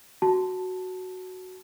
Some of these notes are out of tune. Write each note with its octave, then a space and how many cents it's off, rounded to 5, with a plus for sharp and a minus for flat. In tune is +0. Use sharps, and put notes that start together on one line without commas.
F#4 +0 A5 +0